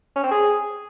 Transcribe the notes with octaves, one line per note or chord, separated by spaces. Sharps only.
C#4
C4
G#4